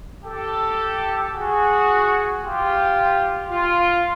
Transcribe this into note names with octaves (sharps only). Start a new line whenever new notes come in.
G4 A4
F#4 G#4
F4 G4
F4